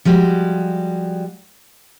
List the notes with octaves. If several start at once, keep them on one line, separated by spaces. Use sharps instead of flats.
F3 G3 G#3 F#4